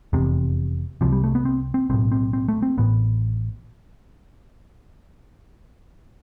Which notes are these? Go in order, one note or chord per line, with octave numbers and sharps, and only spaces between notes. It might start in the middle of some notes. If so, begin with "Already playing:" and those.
F1 E2 C3
C2 C3 F3
G3
A3
B3
C4
C4
B1 A2 C4
C4
C4
A3
C4
A1 A2 B3